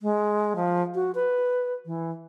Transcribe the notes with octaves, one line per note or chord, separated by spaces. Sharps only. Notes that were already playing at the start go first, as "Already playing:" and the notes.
G#3
F3
F#4
B4
E3